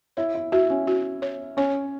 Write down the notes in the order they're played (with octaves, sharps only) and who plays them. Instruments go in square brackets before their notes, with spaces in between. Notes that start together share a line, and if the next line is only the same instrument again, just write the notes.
[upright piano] E4 [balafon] C#5
[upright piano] E4
[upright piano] E4 [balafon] F#4
[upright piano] C#4
[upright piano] E4 [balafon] F#4
[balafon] C#5
[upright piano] C#4 [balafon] C#5